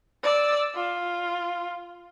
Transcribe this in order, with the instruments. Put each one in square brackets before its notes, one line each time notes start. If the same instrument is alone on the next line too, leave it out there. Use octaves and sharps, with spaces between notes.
[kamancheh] D5 E6
F4